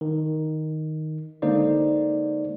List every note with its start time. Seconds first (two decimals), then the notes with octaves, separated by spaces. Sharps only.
0.01 D#3
1.42 D3 G#3 A#3 D#4 C5 D5